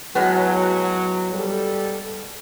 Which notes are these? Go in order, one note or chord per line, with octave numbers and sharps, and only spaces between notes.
A2 F#3 G#3 B3
G3 A4